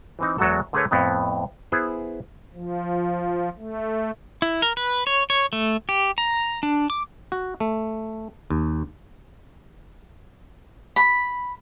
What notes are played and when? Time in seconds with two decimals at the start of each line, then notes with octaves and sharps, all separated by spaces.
0.19 E3 C4 D#4
0.38 E2 F#3 G#3 F#4 A4
0.73 D3 A3 G#4 A#4 B4 C#5
0.91 F2 A2 B3 C4
1.72 B3 E4 G#4 C5
2.54 F3
3.58 A3
4.42 E4
4.62 A#4
4.77 B4
5.07 C#5
5.30 C#5
5.53 A3
5.89 G4
6.18 A#5
6.63 D4
6.90 D6
7.32 F#4
7.60 A3
8.50 D#2
10.96 B5